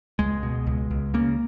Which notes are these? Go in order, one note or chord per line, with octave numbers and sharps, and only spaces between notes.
C#2 G#3
B2
C#2
C#2
C#3 A#3